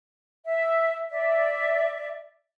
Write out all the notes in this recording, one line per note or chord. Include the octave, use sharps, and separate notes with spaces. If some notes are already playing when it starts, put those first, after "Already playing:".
E5
D5 E5